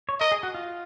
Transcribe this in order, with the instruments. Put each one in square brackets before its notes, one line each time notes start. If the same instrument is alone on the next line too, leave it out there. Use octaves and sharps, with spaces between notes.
[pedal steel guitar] C#5
[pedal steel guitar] A#4 [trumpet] D#5
[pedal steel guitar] G#4
F#4
F4